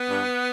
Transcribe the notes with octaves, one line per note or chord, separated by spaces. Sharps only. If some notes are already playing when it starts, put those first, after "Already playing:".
Already playing: B3
G2